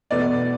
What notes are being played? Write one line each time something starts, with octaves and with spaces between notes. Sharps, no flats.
E2 B2 A3 B4 D5